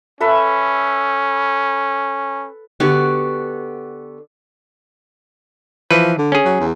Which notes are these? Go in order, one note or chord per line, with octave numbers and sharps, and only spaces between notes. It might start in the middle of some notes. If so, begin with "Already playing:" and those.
C#4 A4 B4 E5
D3 B3 F#4 G4
E3 F3 B4
D3
C#4 G#4
F#3
E2